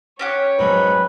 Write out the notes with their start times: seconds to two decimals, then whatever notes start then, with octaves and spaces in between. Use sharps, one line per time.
0.19 C#4 G4 C#5 F#5
0.59 G#2 F#3 B4